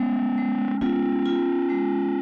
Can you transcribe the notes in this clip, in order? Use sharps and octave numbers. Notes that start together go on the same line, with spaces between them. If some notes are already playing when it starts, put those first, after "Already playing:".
Already playing: G#3 B3 C#4
G#3
B3 C#4 F4
F4
G#3